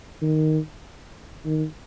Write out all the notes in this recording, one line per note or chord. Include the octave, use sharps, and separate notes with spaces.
D#3
D#3